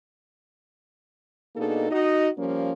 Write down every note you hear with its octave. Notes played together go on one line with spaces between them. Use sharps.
B2 A#3 D4 D#4 G#4 A4
D#4 F#4 D#5
F3 G3 A#3 C#4